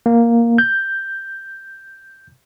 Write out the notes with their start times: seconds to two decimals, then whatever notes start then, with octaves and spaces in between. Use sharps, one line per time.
0.06 A#3
0.58 G6